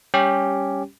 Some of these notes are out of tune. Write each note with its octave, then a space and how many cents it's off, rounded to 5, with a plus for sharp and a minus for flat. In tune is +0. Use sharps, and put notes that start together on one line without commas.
G3 +15 C#4 +0 G4 +0